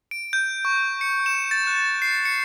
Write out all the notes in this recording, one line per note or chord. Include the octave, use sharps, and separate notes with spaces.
D7
G6
C#6
C#7
E7
A6
F#6
C7
C#7